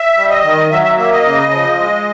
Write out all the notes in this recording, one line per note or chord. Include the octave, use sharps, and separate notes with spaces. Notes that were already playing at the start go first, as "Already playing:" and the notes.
Already playing: E5
G3
D#5
D#3
F#3 E5
E5
A#3 E5
D#5
C#3
F3
G#3